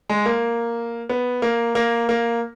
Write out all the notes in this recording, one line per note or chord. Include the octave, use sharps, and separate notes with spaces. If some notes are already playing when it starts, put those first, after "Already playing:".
G#3
A#3
B3
A#3
A#3
A#3